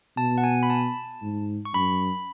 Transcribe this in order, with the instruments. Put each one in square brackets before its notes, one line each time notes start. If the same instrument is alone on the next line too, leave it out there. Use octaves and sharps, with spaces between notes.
[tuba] B2 [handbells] A5
[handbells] F#5
G#5
B5
A5
[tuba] G#2
[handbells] C#6
[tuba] F#2 [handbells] B5